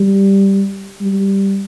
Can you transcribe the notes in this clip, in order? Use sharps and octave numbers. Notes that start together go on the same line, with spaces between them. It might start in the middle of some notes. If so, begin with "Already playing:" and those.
Already playing: G3
G3